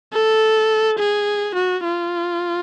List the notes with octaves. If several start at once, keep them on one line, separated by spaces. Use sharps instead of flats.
A4
G#4
F#4
F4